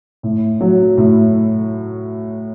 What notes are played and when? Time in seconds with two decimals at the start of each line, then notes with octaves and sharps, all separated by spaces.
0.23 A2
0.61 F#3
0.97 A2